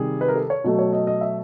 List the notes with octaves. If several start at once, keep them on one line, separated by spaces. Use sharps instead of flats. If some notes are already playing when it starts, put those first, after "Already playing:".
Already playing: C3 D#3 G3 G#4
B4
A#4
A4
C#5
B2 F#3 A3
C#5
D#5
D#5
E5